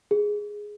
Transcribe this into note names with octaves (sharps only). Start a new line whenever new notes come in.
G#4